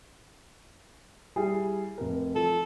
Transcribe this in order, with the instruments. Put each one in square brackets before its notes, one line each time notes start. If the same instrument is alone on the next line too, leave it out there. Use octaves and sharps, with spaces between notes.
[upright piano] G3 E4 G#4
F1 A#4
[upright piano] F3 [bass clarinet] A4